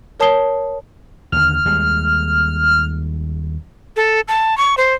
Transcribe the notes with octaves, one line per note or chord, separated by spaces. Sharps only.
A#4 C#5 A5 D#6 C7 G7
D#2 D3 F6
D#2 G3 G#3
A4
A5
C#6
C5